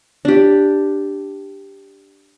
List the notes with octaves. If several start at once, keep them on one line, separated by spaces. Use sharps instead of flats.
D4 G4